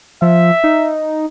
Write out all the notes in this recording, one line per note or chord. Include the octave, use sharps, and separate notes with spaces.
F3 E5
D#4